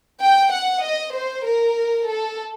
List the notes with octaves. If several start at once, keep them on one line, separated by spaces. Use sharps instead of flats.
G5
F#5
D#5
C5
A#4
A4